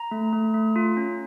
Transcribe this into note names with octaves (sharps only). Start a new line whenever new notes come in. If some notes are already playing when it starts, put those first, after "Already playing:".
Already playing: A#5
A3
A3
A3
F4
C#4